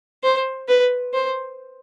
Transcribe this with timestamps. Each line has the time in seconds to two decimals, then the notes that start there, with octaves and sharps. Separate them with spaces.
0.23 C5
0.68 B4
1.14 C5